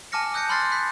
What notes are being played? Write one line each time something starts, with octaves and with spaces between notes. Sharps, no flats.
G#5 A5 D6 F6 A#6 C#7
D#6 F#6 G6 A#6 C#7
B5 C6 F6 F#6 A6 C7
F#6 B6